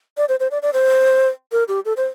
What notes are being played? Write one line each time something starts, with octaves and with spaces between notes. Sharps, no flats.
D5
C5
C5
D5
D5
C5
A#4
G4
A4
C5